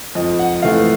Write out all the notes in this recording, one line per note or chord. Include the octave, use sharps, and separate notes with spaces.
F2 D#5
F#5
C3 E3 A3 F5